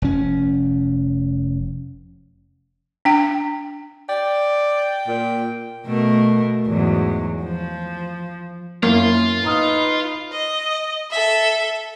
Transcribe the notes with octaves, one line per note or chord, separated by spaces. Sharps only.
F1 C#4
D4 G5
D5 G5
A#2
B2 A3 A#4
E2 G#2 F#3
F3
F#2 A#3 B3 E4 F4
D#4 B4 A#5 D#6 F6
D#5
A4 E5